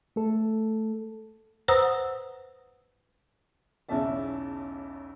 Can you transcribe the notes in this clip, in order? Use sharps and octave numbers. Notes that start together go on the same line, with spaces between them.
A3 A4
B4 C5 F#5 A#5 D#6 E6
B1 E2 C#3 C#4 E5 A5